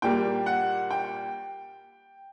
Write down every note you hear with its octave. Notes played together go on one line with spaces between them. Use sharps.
A#2 G3 A#3 G5
F#5
G5